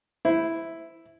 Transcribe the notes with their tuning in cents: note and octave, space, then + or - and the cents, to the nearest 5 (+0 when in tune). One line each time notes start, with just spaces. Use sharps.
E4 +0 C5 -20